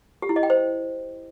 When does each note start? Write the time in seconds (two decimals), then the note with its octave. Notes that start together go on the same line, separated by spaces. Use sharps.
0.22 G4
0.29 E4
0.36 D#5
0.43 G5
0.50 C5